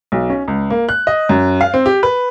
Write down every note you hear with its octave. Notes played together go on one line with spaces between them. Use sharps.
B1
C#4
C#2
A#3
F#6
D#5
F#2
F5
C4
G4
B4